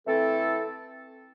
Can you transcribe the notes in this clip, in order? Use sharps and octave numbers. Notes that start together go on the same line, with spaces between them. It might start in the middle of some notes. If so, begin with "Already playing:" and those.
E3 A3 C4 E4 A4